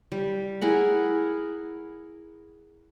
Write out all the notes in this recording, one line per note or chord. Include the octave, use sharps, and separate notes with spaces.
G3
E4 G#4 A#4 F#5